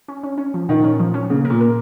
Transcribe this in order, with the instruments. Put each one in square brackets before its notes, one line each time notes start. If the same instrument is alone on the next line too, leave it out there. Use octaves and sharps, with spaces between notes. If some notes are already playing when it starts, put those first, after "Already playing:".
[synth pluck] C#4
C#4
C#4
F3
[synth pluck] A#2 [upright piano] D#3
[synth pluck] C#4
F3
C#4
[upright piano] C#3 [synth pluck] A#3
[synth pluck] A#4
[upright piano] A#2
[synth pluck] A#4